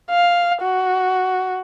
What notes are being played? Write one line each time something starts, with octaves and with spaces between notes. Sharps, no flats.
F5
F#4